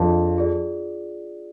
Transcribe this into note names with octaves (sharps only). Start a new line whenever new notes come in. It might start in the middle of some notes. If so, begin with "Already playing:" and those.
Already playing: F2 D4 F4 G#4 D5 F5
F4 G#4 D5